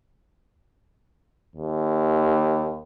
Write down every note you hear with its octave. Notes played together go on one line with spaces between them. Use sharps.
D#2